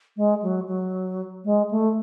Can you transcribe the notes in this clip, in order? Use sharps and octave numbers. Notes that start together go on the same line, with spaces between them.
G#3
F#3
F#3
G#3
A3